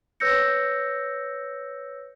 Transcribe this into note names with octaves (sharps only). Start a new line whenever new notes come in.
B4 C#5 E6 G6 A#6 C#7